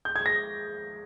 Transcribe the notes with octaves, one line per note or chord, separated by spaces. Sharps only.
G6
G#6
A#6